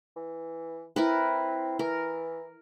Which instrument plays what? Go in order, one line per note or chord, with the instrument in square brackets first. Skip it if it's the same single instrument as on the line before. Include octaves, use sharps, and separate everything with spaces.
[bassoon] E3
[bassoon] C4 [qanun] E4 A#4 B4
[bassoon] E3 [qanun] A#4